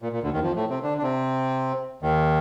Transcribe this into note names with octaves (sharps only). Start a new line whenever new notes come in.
A#2
A#2
D2 D3
D#2 D#3
F2 F3
A2 A3
C3 C4
D3 D4
D4
C3 C4
D#2 D#3